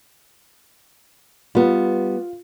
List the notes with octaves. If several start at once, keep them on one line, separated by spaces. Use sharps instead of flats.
G3 B3 F4